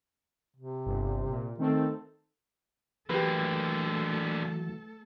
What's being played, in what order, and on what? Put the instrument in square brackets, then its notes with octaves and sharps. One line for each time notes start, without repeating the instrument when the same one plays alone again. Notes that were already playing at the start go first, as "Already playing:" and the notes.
[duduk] C3
[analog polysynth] G1
A#2
[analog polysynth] D#3 A3 C4 [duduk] A4
[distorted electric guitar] D3 A#3 [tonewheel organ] E3 F#3 [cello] A3 A4 [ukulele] G4 B4